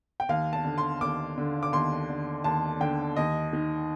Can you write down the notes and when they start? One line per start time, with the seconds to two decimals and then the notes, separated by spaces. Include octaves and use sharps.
0.20 G5
0.29 D#2 F5
0.53 A5
0.65 D3
0.78 C6
1.01 D#2 D6
1.38 D3
1.63 D6
1.72 D#2 C6
2.10 D3
2.44 D#2 A5
2.80 D3 G5
3.16 D#2 D#5
3.53 D#3